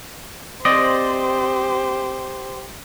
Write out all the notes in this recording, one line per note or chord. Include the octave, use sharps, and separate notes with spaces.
C4 G4 C5 D5 D#5